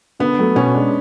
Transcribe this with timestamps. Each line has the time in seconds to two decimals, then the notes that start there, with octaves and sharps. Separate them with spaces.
0.19 D3 B3
0.39 F#3 A3
0.55 B2 C#4
0.74 G#3 D4